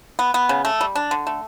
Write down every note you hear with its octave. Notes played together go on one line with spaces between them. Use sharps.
B3
B3
C#3
A3
G3
D4
D3
A3